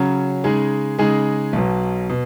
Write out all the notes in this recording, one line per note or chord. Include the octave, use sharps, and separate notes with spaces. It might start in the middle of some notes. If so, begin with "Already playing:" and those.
Already playing: C#3 F#3 C#4
C#3 G#3 D#4 G#4
C#3 G#3 D#4 G#4
B1 B2 F#3
B2